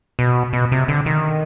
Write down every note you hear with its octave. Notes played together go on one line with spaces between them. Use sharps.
B2
B2
C3
D3
D#3